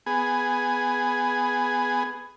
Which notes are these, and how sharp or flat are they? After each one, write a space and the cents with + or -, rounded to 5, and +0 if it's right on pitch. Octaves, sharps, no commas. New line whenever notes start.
B3 +10 G#4 +0